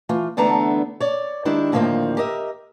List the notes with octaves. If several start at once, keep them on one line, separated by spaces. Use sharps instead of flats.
E3 A3 F4
E2 D3 A3 B3 D4 A#5
C#5 D5
D#3 G#3 D4 E4 G4
D#2 A2 D3 F3 A#3 C4
G4 A#4 D#5 E5